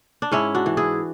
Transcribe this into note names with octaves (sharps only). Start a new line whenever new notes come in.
D4
G#2 C#4 E4
D4 F#4
E3
E4 G#4